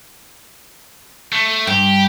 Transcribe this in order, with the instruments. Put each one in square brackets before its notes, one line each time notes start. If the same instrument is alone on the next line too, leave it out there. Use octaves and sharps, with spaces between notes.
[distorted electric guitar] A3
[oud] G2 [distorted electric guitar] G4